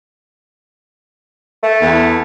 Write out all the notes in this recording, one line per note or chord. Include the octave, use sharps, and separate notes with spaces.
A3
E2